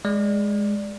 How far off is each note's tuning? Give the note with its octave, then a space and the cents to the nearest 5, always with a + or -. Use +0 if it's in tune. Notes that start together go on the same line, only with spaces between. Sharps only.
G#3 +0 D5 +0